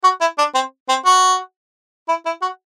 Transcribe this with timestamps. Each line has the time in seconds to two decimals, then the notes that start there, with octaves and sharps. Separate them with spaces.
0.04 F#4
0.21 E4
0.38 D4
0.55 C4
0.89 C4
1.06 F#4
2.08 E4
2.26 E4
2.42 F#4